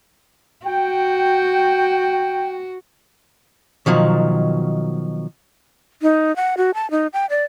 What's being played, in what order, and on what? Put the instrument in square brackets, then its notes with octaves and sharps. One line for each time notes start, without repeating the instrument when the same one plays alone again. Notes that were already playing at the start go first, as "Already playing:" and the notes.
[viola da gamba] F#4 [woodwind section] G5
[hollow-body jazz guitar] B2 D#3 F3 F#3
[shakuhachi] D#4
F#5
F#4
A5
D#4
G5
D5